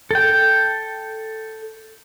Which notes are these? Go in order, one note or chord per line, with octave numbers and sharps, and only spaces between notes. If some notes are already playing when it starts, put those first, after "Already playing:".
A4 G5